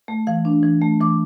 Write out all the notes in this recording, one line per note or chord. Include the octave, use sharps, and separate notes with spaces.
A3
E3 F5
D4
E3
A3
E3 D6